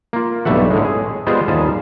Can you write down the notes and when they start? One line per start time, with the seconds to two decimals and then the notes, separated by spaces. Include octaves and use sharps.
0.13 A#3 F4
0.45 B1 G2 G3 A3 E5 F#5
0.71 A2 D3 G#3
0.85 G#4
1.27 G3 G#3 B3 F4 G#4 C5
1.48 D#2 F3 G3 G#4 A5